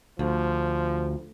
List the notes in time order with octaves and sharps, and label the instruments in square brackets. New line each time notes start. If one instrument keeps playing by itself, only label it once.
[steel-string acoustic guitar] D2 [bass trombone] F3